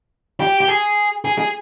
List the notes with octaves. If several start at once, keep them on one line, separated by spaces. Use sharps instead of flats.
G4
G4
G#4
G#4
G#4